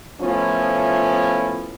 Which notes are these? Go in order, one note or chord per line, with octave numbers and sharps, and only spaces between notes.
F3 A3 B3 C#4 E4 F4